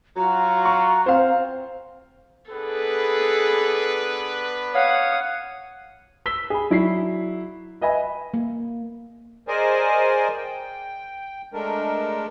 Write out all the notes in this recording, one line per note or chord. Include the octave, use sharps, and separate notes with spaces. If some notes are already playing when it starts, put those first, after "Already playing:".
F#3 F4 F#4 A#5
C#6
C4 C5 F5
B3 D4 G#4 A4 B4
C#5 F5 F#5 D#6
E6 B6 G7
G#4 B5
F#3 E4 D5 B6 C7
B4 D#5 E5 G#5 B5
A#3
G#4 A#4 C5 D5 D#5 G#5
G5
G#3 A3 D4 A#4